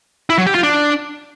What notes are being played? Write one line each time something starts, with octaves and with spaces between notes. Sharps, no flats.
E4
F#3
G4
F4
D4